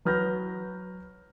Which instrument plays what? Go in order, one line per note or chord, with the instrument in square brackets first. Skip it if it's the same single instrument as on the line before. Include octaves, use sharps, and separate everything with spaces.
[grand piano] F#3 B4 F6 G6 A#6